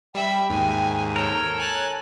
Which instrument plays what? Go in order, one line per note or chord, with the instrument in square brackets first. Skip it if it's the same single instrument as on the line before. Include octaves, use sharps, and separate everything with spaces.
[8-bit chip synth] G3 [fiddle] E5 B5 [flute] G5
[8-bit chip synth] D#2 G#2 [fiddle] G#5
[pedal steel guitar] A4 A#4 [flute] C#5 [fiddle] G5
[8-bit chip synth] G#5 A5 [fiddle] F#6